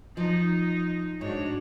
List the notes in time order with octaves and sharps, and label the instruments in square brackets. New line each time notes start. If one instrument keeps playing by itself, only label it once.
[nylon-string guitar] F3 [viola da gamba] D#4
[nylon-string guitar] G#2 [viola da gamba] D4 F#4 C#5